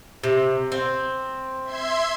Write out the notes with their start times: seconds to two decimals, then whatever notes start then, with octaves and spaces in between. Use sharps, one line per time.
0.24 C3
0.72 C4
1.64 E5 C6 G#6